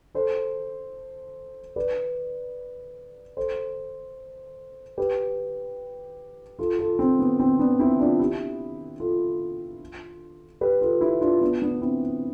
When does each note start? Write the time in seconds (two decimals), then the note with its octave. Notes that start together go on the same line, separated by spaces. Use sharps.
0.15 A4 C5
1.76 B4 D5
3.37 A4 C5
4.98 G4 B4
6.59 F4 A4
6.79 F4 A4
6.99 C4
7.19 B3
7.40 C4
7.59 B3 D4
7.79 C4 E4
7.99 D4 F4
8.20 E4 G4
9.00 F4 A4
10.61 G4 B4
10.81 F4 A4
11.01 E4 G4
11.21 D4 F4
11.41 B3 D4
11.62 B3 D4
11.81 C4 E4